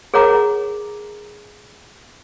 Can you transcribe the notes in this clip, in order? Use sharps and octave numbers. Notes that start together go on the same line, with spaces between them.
G#4 A#4 C#5 F#5 A#5 D6